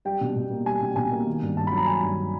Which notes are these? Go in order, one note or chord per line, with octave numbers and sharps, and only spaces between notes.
G3 G5
B2
B2
A#3
G3 G#5
B2
B2 G#5
A#3
D#3
G2
G2 A5
B5
F#3
A#5
D#3 G#5
G2